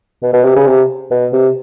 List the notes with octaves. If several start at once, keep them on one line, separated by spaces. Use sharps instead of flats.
B2
B2
C3
C#3
C3
B2
C3